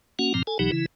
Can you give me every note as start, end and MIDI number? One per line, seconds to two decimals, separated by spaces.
0.19 0.33 58
0.19 0.33 61
0.19 0.33 66
0.19 0.33 78
0.34 0.43 43
0.34 0.43 46
0.34 0.43 53
0.34 0.43 60
0.34 0.43 82
0.47 0.58 69
0.47 0.58 80
0.59 0.71 35
0.59 0.71 47
0.59 0.71 52
0.59 0.71 54
0.59 0.71 63
0.59 0.71 67
0.72 0.86 49
0.72 0.86 52
0.72 0.86 64